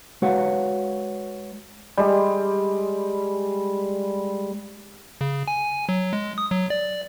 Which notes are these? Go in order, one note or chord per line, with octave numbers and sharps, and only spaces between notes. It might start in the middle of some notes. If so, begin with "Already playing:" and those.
G#3 F#4 B4 C#5 F5 F#5
G3 G#3
C#3
G#5
F#3
G#3
D#6
F#3
D5